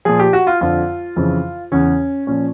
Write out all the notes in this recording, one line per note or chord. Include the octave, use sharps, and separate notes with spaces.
A#2 F3 G#4
G4
F#4
F4
F2 D3 F3 F4
F2 C#3 E3
E2 C#3 E3 C#4
A#2 F3 C#4